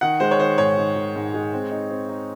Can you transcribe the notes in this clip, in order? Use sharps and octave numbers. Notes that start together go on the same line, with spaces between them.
D#3 F#5
G#3 C5
C#5
D#3 C5
G#2 C#5
D#3
D#3
G#2
G#3
C4
D#4
C4
D#4